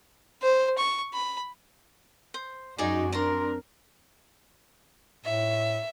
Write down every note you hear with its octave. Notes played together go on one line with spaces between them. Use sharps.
C5
C#6
B5
C5
F#2 D#4 F#4 G#4 D5 G#5
C4 D4 A#4 D5 A#5 C6
A2 E5